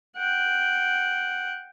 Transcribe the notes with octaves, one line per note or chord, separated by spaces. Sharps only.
F#5 G5